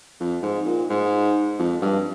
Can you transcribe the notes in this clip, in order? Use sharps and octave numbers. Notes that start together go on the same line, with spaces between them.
F2
G#2
A#2
G#2
F2
G2